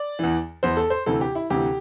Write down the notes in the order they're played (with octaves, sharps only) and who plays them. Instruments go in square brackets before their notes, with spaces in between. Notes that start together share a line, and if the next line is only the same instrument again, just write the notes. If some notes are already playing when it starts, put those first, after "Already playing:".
Already playing: [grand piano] D5
E2 E3
E2 E3 C5
A4
C5
D2 C3 E3 A4
G4
E4
D2 C3 E3 G4